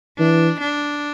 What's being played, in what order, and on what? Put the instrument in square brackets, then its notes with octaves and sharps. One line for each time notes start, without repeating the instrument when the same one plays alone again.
[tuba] E3 [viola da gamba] D4
[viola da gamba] D4